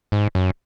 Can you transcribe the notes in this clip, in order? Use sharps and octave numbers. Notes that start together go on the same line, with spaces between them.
G#2
F#2